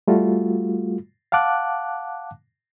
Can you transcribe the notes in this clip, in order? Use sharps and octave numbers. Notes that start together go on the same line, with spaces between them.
G3 A3 F4 F#4
F5 F#5 A5 D6 F#6